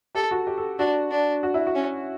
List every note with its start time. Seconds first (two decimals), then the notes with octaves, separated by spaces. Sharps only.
0.15 G4 A4
0.31 F#4
0.47 G4
0.58 A4
0.79 D4 F#4
1.11 D4
1.43 F#4
1.54 E4
1.67 F#4
1.75 C#4